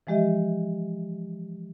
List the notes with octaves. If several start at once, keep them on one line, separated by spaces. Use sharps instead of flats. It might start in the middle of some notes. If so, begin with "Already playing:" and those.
E3 F3 G#3 G4 D#5 E5